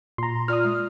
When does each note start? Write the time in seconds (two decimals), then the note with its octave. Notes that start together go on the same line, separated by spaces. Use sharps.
0.18 A#2 A#5 C6
0.48 F4 D5 D#6 F6
0.64 G#3